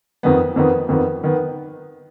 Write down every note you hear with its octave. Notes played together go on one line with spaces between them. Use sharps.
F2 D#3 B3
F2 D#3 B3
F2 D#3 B3
D#3 B3